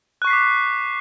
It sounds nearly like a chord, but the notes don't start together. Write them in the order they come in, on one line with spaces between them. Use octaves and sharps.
F#6 C#6 C7 B6 D6